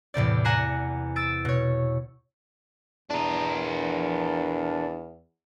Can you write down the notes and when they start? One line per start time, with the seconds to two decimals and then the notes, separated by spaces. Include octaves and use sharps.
0.14 E2 A2 C3 D5
0.44 F#5 G#5 A#5 F#6 C7 E7
1.16 E6 A6 D7
1.45 B2 C#5
3.10 E2 D4 A#4